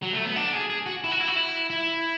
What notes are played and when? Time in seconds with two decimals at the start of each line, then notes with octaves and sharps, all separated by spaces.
0.03 F#3
0.13 A3
0.25 B3
0.36 D4
0.53 G#4
0.70 G#4
0.86 F#4
1.04 E4
1.11 F#4
1.20 E4
1.27 F#4
1.36 E4
1.70 E4